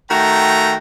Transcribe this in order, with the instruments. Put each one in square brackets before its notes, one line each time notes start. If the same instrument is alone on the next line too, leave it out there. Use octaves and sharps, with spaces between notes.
[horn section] D#3 A3 F#4 G5 A#5